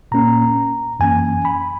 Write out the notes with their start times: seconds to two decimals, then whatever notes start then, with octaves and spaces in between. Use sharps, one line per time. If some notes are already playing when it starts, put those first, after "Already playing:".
0.12 A#2 A#3 C#4 A#5
1.00 F#2 E3 A#3 C#4 G#5
1.45 B5